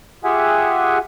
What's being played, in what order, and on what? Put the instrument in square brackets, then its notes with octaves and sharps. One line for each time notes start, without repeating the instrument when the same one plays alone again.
[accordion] F4 G4 G#4 E5 F#5 G#5